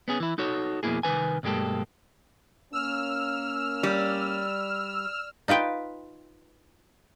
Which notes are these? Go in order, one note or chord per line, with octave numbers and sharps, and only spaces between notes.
B3 C#4 G#4
E3 E4
D#4 F#4 A4 C#5
F2 B2 D#3 A#3 E4 G#4
C2 D#3 D#4 B4 G#5
B1 G2 G#3 A#3 G4 A4
A#3 C#4 E6 F6
G3
D#4 F4 B4 G5